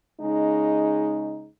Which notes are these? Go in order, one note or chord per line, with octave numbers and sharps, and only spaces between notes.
C#3 G#3 D#4